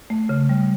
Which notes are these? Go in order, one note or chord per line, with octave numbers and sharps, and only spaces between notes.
A3
C#3
G3